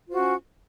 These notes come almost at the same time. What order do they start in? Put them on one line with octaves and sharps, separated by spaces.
F4 C5 F#4 C#4